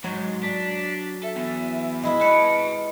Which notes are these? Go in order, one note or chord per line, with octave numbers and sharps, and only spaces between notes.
G#2 F#3
D4 B6
A4 E5
E2
G#3 E4 E5
B4 D#5 A5 C#7